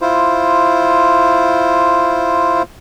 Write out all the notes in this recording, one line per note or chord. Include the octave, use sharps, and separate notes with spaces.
E4 F4 C5